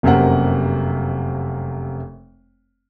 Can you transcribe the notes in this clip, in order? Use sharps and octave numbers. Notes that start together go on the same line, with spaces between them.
F1 F#2 C3 A#3 F#5